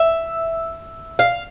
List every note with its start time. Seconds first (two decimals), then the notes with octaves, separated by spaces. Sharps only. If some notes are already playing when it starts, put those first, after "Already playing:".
Already playing: E5
1.19 F5